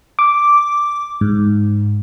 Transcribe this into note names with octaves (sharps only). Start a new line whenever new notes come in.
D6
G#2